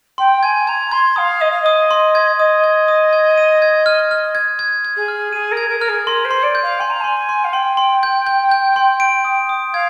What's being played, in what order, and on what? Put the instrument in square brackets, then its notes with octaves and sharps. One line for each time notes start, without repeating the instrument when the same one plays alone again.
[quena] G5 [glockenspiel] C6
[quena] G#5 [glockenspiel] G#6
[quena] A#5 [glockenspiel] G#6
[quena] C6 [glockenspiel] G#6
[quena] F5 [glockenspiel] D#6
[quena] D#5 [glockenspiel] D#6
[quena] F5
[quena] D#5 [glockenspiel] D#6
[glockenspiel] C6
G#6
[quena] D#5 [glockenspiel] D#6
[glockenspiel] G#6
D#6
G#6
D#7
G#6
F6
F6
G#6
G#6
G#6
[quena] G#4
[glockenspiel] F6
[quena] G#4 [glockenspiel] D#7
[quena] A#4
[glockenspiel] G#6
[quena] A#4
[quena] A#4 [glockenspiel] F6
[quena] G#4
[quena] A#4 [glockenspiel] C6
[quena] C5
[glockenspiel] C6
[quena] D5
[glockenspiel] G6
[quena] F5
[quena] G#5 [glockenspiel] C6
[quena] A#5
[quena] G#5 [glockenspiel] C6
[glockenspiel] C6
[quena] F5
[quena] G5 [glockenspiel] C6
[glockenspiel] C6
G6
G6
G6
C6
D7
D#6
D#6
[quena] F5 [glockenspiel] G#6